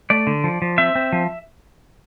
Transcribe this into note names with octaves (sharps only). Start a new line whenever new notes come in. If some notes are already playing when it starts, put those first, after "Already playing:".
A3 D5
D3
F3
F3
C4 E5
C4
F3